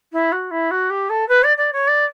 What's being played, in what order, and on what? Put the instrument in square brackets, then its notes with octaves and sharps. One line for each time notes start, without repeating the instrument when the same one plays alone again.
[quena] E4
F#4
E4
F#4
G4
A4
B4
D5
D5
C#5
D5